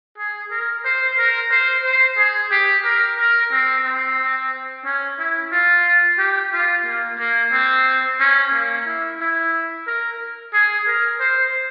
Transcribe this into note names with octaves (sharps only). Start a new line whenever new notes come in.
G#4
A#4
C5
A#4
C5
C5
G#4
G4
A#4
A#4
C4
C4
C#4
E4
F4
G4
F4
A#3
A#3
C4
C#4
A#3
E4
E4
A#4
G#4
A#4
C5